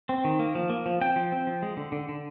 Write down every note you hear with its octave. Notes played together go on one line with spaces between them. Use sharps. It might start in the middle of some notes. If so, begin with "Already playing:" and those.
C4
D#3
A#3
F3
A#3
F3
C4 G5
F3
C4
F3
G#3
D3
D3
D3